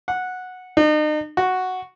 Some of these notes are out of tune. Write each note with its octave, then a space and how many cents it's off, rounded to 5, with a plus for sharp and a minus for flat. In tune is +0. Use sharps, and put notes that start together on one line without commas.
F#5 -10
D#4 -40
F#4 +0